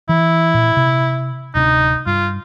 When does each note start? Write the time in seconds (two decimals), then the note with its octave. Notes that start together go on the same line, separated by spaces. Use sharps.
0.09 E3 E4
0.54 A#2
0.77 C3
1.55 D1 C3 D4 D#4
2.06 G2 F4